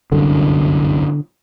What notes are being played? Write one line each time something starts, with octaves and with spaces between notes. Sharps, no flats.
G1 C2 F#2 D3